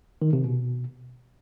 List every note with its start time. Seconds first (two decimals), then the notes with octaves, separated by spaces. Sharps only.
0.22 D#3
0.33 C3
0.45 B2